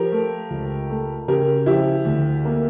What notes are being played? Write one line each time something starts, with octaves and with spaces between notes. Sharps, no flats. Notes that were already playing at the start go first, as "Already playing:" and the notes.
Already playing: F3 G4 A#4
A3
C#2
A3
C#3 G4 A#4
F3 E4 G4
D2
A#3